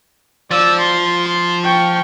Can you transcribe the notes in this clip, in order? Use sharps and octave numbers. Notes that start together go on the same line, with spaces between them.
F3 D5 E6
C6
C6
G5 C#6